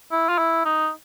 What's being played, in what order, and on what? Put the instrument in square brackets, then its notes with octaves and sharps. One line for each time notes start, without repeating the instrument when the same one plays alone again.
[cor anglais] E4
F4
E4
D#4